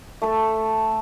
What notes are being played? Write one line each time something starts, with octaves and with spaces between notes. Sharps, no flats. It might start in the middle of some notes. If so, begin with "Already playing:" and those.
A3 A4